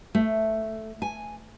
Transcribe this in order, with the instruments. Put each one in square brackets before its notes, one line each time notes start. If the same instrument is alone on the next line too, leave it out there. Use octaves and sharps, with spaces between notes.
[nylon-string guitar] A3
G#5